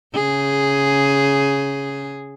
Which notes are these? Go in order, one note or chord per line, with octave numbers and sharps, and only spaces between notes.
C#3 G#4